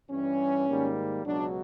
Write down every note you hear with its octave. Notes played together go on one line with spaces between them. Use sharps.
G2 E3 G3 C#4
G#2 D#3 G3 A#3
C#2 B2 F#3 D4